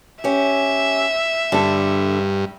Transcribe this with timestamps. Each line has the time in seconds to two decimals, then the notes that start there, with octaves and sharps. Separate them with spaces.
0.24 C#4 G4 E5
1.52 G2 D3 A4